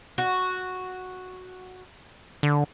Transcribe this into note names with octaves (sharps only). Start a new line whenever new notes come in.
F#4
D3